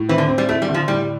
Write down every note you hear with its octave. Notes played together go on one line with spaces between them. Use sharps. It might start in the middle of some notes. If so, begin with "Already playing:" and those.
Already playing: A2
E3 C4
D3
C4
G3
A3 E4
G3
D3
F3
A2 G3